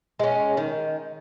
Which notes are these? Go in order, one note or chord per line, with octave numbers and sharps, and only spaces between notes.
G#3 C#4
D#3